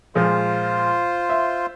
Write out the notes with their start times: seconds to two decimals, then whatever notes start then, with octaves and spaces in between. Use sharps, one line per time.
0.15 A#2 F3 G#3 F4 C5
1.29 E5